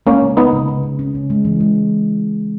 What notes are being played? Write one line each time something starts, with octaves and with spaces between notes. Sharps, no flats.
G#3 A#3 C#4
C#3
C#3 B3 D#4
C#3
C#3
C#3
C#4
C#3
G#3
E3
G#3